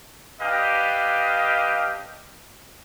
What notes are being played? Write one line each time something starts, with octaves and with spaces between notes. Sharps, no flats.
D4 G4 B4 D#5 F5